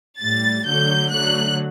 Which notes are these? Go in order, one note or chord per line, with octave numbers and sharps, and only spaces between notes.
A2 G3 A6
D3 F#3 A3 G6
D3 F#3 A3 F#6